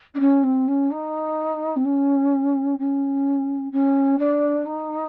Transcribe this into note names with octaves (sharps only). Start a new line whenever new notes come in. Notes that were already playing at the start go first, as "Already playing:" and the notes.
D4
C#4
C4
C#4
D#4
C4
C#4
C#4
C#4
D4
D#4